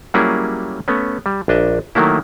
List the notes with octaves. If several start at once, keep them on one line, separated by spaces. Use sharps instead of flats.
F#3 G3 A#3 C#4 E4 G#4
A3 B3 C#4
G3
A#1 D4 D#5 E5
D#3 F#3 A3 A#3 E4